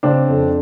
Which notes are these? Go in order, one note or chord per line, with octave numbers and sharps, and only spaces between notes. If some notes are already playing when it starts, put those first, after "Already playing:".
C#3 C4 D4
F2